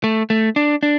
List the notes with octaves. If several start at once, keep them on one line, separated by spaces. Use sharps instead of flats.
A3
A3
D4
D4